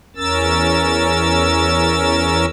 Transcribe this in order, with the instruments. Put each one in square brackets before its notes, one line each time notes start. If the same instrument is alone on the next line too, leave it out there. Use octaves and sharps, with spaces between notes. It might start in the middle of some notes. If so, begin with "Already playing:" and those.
[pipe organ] E2 C#4 A#4 E6 A6